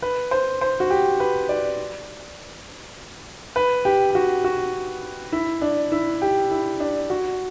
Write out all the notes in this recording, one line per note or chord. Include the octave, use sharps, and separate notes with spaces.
B4
C5
C5
F#4
G4
B4
D5
B4
G4
G4
F#4
F#4
E4
D4
E4
G4
E4
D4
F#4